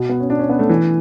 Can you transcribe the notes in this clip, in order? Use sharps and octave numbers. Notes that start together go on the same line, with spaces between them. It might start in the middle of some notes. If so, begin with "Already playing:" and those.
Already playing: B2
B3
C#4
D4
C#4
B3
A3
E3